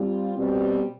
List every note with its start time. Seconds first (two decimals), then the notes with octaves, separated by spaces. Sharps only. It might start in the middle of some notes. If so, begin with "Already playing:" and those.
Already playing: G3 C4 F4
0.37 B2 G3 C4